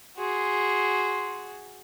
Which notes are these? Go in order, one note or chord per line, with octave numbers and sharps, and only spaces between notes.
F#4 G#4 C6